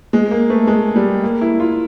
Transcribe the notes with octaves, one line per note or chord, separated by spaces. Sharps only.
G#3
A#3
A3
G#3
G3
A#3
E4
F4